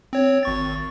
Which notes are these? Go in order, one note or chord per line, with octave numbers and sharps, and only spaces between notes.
C4 C#5
G#1 C#6 A6